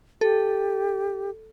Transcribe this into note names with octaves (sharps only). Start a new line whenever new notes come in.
G4 A4